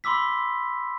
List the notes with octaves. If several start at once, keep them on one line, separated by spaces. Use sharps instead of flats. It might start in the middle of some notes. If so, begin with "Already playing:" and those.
B5 C6 D6 E6 B6